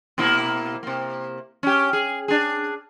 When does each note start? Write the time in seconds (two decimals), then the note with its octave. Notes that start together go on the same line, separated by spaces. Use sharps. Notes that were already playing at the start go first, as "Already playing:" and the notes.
0.18 B2 A#3 E4
0.83 C3 A#3
1.63 C#4 G4
1.93 G#4
2.28 D4 G#4